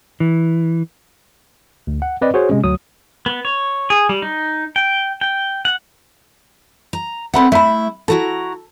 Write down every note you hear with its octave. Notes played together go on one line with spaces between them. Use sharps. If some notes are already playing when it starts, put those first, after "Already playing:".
E3
D2
F#5
C4 B4 D5 D#5
F#4 G#4 C5 C#5
C3 G#3 C#4
D2 F#3 D#6
B3
C#5
G#4
G3
D#4
G5
G5
F#5
A#5
C4 A4 E5 F#5 B5
A3 E4 E5 B5
E4 F#4 A4 A#5